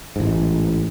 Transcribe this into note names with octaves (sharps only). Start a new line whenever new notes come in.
A1 G#2